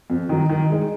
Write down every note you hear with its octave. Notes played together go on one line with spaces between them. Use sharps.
F2
D#3 F#3
D#3
G#3 D#4